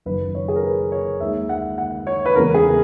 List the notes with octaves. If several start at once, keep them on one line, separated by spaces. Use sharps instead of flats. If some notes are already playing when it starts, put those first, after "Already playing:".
F#1 F#2 D#3 B4
C#5
G#4
A#4
B4
C#5
D#2 D#3 G#3 E5
F#5
F#5
C#5
B4
E2 C#3 E3 G#3 B3 A#4
G#4